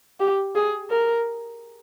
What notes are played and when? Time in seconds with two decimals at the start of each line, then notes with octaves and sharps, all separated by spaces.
0.20 G4
0.55 G#4
0.90 A#4